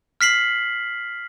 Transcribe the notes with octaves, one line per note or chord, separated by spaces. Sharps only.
F6 B6 C7 F#7